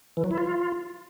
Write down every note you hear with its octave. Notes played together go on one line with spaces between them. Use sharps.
E3
F#3
E4
F4